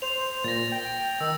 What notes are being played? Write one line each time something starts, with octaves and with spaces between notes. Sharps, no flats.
C5 F7
A#2 A6 A#6
G5
D#3 E6